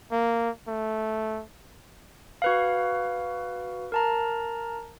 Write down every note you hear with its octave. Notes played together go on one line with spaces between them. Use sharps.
A#3
A3
F#4 B4 F5
A#4 A5 A#5